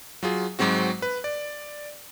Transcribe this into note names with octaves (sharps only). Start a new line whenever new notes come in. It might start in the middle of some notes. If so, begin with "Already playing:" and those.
F#3 F4 G#4
G#2 F#3 G#3 C4 F#4
B4
D5